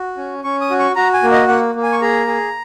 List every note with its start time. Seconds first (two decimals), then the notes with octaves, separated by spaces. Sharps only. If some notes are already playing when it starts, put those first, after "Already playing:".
Already playing: F#4
0.17 C#4
0.44 C#4 C#6
0.61 D#6
0.70 F#4
0.79 C#6
0.96 F#4 A#5
1.14 G#5
1.23 A#3
1.31 D#5
1.48 A#3 F#5
1.75 A#3
1.83 G#5
1.92 C#6
2.01 G#4 A#5
2.27 G#4